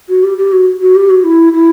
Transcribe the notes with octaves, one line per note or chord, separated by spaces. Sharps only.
F#4
G4
G4
F#4
F#4
G4
F#4
E4
E4